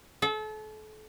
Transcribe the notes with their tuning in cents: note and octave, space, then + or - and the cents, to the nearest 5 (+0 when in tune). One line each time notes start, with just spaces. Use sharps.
A4 -35